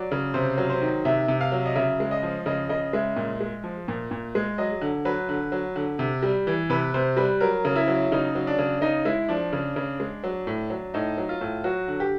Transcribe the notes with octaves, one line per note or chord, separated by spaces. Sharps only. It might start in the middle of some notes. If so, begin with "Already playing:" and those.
Already playing: F#3 D5
C#3
C3 C5
F#3
C5
D#3
C3 E5
C3
F5
F#3
D#5
C#3 E5
G#3
D#5
F3
C#3 D#5
C#3 D#5
G#3 E5
A#2
G#3
F3
A#2
A#2
G#3
F#3 D#5
D3
F#3 B4
D3
F#3
D3
C3
G3
E3
C3 B4
C3 C5
G3 B4
F#3 A#4
C#3
E4
F#3
C#3 D#4
F#3
D4
C#3
C#3 D#4
G#3 E4
F3 D4
C#3
C#3
G#3
F#3
A2
F#3
A2 D#4
F#3
F4
A2
F#3 F#4
D3
G4